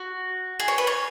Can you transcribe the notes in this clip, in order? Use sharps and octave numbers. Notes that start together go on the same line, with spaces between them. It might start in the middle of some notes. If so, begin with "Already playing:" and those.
Already playing: F#4
G#4
C#5
B4
C#5